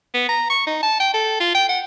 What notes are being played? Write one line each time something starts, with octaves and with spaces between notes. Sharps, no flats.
B3
A#5
C#6
D#4
A5
G5
A4
F4
G5
F#5